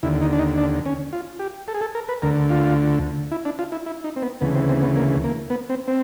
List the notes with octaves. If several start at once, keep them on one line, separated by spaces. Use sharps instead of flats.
D#2 D3 E4
D#4
D4
D#4
D4
C#4
F4
G4
A4
G#4
A4
A#4
B4
D2 D3 A#4
F4
E4
D4
F4
E4
E4
D#4
C4
B3
D2 C#3 E3 B3
C4
C4
B3
A#3
A#3
B3
C4
C4